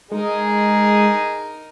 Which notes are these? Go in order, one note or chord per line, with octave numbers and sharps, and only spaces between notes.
G#3 D#4 G#4 A#4